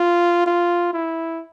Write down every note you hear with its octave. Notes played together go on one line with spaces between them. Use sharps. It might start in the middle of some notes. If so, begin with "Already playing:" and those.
Already playing: F4
F4
E4